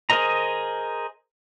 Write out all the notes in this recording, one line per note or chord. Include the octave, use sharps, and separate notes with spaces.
G#4 A#4 C5 D#5 A#5